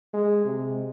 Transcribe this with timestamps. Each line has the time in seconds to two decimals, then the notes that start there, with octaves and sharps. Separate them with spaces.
0.14 G#3
0.45 C3